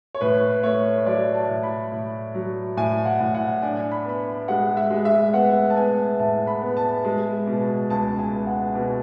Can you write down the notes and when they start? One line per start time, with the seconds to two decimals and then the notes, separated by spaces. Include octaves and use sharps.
0.15 C#5
0.21 A2 B4
0.63 A3 C#5
1.06 F#3 D5
1.34 A5
1.49 A2
1.63 B5
1.92 A2
2.34 F#3
2.77 A2 G#5
3.05 F#5
3.20 A2
3.35 F#5
3.62 D4 G#5
3.91 B5
4.05 B3 B5
4.48 G#3 F#5
4.77 E5
4.91 G#3
5.05 E5
5.33 B3 F#5
5.70 A5
5.77 B3 G#5
6.19 A2 A5
6.47 B5
6.62 B3
6.77 A5
7.05 G#3
7.47 B2
7.90 C#2 A5
8.19 G#5
8.33 C#2
8.47 F#5
8.75 B2